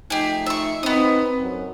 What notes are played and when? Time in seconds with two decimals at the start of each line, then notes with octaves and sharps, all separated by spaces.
0.10 F3 A3 D#4 G4 G#4
0.46 E5 C#6
0.83 B3 C4 D#4 D#6
1.40 F#2